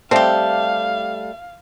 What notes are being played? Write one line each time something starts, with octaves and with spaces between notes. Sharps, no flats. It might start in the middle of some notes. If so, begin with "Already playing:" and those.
G3 A3 C4 G4 A4 F5 A5